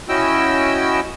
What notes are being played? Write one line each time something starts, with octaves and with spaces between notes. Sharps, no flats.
C#4 E4 F#4 D#5 G5 E6